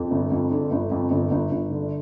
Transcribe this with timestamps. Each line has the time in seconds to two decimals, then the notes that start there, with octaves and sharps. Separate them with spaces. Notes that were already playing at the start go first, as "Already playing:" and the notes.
Already playing: F2
0.11 G1
0.31 F2
0.52 D3
0.71 G1
0.91 F2
1.11 G1
1.31 G1
1.51 G1
1.71 D3